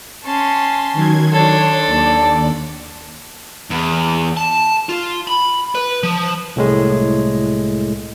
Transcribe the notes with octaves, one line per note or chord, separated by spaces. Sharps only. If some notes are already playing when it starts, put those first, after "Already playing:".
C#4 A5 C6
D#3 F#3 G#6
D4 A4 C#5 C6
D#2 D5
E2
A5
F4
B5
B4
F3
C2 A2 G#3